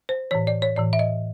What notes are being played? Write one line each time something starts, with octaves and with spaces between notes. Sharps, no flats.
C5
A2 E3 C#5
D5
C#5
A2 E3 D5
E5
D#5